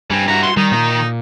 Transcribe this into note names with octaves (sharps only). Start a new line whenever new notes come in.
G2 G3 C4 G#5
E4 F#4 A#5
C6
D#3 G3 D#4
A#2 D#4